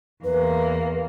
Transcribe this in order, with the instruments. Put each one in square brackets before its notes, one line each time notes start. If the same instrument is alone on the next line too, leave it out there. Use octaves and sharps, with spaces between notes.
[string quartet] E2 A#3 [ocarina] B4